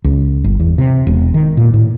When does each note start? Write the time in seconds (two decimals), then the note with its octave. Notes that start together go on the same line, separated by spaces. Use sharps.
0.04 C#2
0.44 G1
0.60 E2
0.78 C3
1.07 E1
1.34 D#3
1.57 A#2
1.74 A2